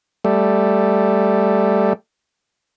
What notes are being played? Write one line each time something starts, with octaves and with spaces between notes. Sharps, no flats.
G3 A3